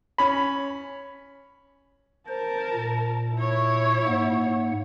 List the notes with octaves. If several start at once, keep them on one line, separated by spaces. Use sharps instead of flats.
C#4 B5
A#4 C5 A5
A#2
E4 C#5
G#2 A#3 F#5